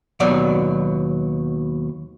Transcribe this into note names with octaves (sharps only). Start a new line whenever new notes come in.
D#2 B2 F#3 D5